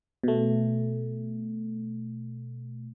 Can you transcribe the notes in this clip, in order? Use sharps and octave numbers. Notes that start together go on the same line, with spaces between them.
B2 A3